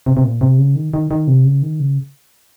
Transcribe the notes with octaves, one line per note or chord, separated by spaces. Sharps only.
C3
C3
A#2
C3
C#3
D#3
D#3
D#3
C3
C#3
D#3
C#3